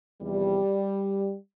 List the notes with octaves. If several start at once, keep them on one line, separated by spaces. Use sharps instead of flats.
E2 C3 F3 G3